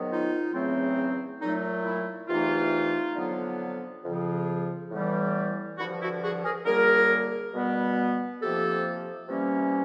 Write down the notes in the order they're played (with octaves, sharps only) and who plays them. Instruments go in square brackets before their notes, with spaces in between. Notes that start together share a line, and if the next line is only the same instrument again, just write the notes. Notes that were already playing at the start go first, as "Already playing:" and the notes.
Already playing: [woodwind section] G#2 D#3 F#3 B3
D#4 F4
E2 C#3 F#3 A3 C4
A#2 F#3 A3 D#4
E4
E2 C3 E3 A3 D#4 F4
F2 D3 F#3 B3
F2 C#3 F3
A2 E3 G3 B3
G2 D3 F3 E4 F#4
E4 F#4
F#4 G#4
G#4 A#4
F#2 D3 G3 A#3 G#4 A#4
B2 G3 B3
F2 C3 F3 A#3 G4 A4
C3 E3 G3 A#3 C#4